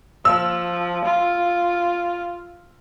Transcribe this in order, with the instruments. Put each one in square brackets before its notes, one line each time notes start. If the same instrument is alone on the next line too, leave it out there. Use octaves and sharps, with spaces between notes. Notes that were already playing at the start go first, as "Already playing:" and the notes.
[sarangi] F3 [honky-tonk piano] E6
[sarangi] F4